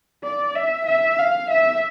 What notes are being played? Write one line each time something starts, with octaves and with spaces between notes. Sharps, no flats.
D5
E5
E5
F5
E5